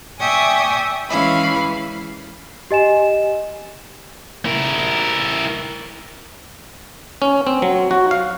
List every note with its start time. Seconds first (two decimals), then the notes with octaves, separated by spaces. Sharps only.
0.20 D5 E5 G5 G#5 C#6 D#6
1.09 E3 G#3 C#4 E4 F5 B5
2.71 G4 D#5 G#5 E7
4.46 E4 A#4
7.22 C#4
7.47 C4
7.62 F#3
7.91 F#4
8.11 F5